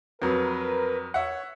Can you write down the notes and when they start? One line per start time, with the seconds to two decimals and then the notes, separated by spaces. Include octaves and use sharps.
0.22 F2 F#3 A#4 B4
1.14 C#5 E5 F#5